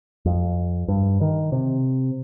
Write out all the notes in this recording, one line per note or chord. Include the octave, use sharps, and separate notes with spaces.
F2
G2
D#3
C3